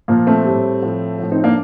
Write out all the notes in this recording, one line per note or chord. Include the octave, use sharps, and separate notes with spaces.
A#2 F3 A#3
A3 C4
A2 G3
A2 F3
A2 F3
C4 D#4
A#3 D4